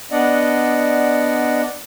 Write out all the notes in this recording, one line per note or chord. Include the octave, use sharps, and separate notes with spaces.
B3 D4 D5 D#5 F#5